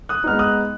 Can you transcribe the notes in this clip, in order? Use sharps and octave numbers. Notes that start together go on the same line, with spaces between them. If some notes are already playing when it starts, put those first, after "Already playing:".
D#6 F#6
G#3 B3 D#4 F6
D#6 F#6